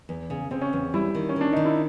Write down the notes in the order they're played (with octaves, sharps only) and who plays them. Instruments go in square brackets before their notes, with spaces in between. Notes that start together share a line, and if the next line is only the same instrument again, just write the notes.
[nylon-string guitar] E2
C#3
[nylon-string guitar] C#3 [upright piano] C4
[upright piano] C#4
[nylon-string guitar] E2
[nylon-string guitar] G3 [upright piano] E4
[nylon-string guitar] D#3
[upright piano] C#4
[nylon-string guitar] D#3 [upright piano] D4
[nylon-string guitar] D#3 [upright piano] D#4
[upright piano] E4